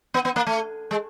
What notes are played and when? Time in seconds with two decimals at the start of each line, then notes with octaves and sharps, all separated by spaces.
0.14 B3
0.25 B3
0.36 A#3
0.47 A3
0.91 G#3